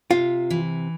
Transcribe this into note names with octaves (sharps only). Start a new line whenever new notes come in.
C3 F4
E3